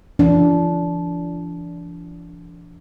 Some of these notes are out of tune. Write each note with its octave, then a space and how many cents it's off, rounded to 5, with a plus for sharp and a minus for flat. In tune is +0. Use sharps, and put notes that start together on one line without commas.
F3 -45 D4 -20